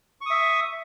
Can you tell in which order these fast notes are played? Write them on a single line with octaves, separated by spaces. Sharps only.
C#6 D#6 E5